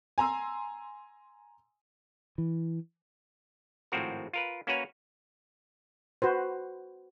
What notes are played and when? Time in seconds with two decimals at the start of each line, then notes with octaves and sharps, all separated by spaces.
0.18 G#5 A#5 C6 E6
2.38 E3
3.92 G#1 A2 F3 C4 F#4 A#4
4.33 F4 A#4 B4
4.67 A#3 C#4 F#4 B4 C#5 A#5
6.22 F#4 B4 C5